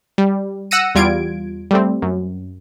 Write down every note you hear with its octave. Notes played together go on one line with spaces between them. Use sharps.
G3
F#5 E6 A#6 C#7 D#7
E2 G3 F4 G#6 D7
G3 A3 C4
F#2